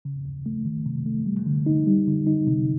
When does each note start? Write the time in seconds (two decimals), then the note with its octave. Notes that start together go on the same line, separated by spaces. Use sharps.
0.05 C#3
0.25 D#2
0.46 A3
0.65 D#3
0.86 C3
1.06 A3
1.26 G3
1.46 D3
1.66 D#4
1.87 G3
2.07 D3
2.27 D#4
2.47 C3